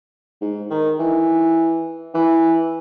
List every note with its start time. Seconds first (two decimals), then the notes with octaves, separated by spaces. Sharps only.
0.41 G#2
0.70 D#3
0.99 E3
2.14 E3